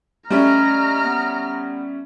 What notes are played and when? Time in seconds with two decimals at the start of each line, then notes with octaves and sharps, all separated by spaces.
0.30 G3 A3 C#4 D#5 A#5 F6
1.04 B3